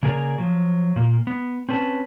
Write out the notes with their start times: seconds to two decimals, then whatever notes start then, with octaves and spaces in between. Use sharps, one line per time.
0.03 C#3 A#3 G#4 A#4 D5 A#5
0.38 F3 F#3
0.96 A#2 A#3
1.27 B3
1.69 C4 C#4 B4 A5